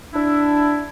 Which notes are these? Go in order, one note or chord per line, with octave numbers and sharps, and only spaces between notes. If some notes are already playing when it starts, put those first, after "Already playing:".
D4 E4